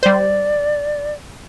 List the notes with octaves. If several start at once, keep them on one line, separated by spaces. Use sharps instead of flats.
G3 C5 D5